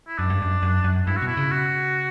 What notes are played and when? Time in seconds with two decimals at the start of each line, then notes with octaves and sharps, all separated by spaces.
0.08 E4
0.18 F#2 D4
0.30 G2
0.42 F#2
0.63 F#2
0.84 F#2
1.07 G2 E4
1.17 F#4
1.22 B2 E4
1.37 C#3
1.52 F#4